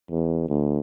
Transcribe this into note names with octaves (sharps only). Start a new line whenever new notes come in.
E2
D2